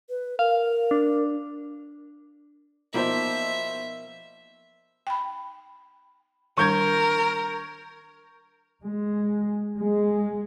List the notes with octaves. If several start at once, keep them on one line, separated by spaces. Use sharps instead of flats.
B4
A#4 F5
D4
B2 F3 A#3 D#4 C5 E5
G5 B5
D#3 G3 D4 A#4 C#6 G6 G#6
G#3
G#3